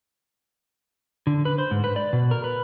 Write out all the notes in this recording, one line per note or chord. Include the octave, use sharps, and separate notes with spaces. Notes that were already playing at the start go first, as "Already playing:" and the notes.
D3
B4
C5
G#2
B4
D5
B2
A#4
B4